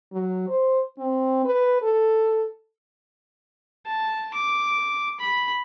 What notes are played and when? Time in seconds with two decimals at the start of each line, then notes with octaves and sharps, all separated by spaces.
0.13 F#3
0.48 C5
0.98 C4
1.45 B4
1.82 A4
3.86 A5
4.34 D6
5.20 B5